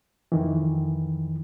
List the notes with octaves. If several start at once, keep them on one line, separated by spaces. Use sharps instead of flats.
F2 D#3 E3